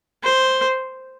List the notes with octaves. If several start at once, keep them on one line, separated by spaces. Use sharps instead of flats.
C5